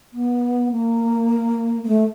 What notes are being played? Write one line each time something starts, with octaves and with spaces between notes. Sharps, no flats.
B3
A#3
A#3
A3